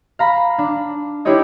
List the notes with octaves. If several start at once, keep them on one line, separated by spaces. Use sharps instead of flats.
F5 A#5 B5
D4
D4 E4 G4 B4 C#5 D#5